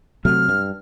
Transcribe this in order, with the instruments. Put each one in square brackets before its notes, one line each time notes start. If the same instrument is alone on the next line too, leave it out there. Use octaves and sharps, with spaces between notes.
[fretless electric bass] C3 F#3 A3 [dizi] F6
[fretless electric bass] G2